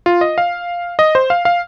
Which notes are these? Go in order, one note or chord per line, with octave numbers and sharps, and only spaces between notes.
F4
D#5
F5
D#5
C5
F5
F5